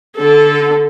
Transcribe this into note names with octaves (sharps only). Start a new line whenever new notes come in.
D3 A4